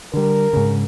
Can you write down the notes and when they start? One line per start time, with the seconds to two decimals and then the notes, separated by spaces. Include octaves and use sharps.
0.14 D3 G3 A#4
0.53 G#2 C#3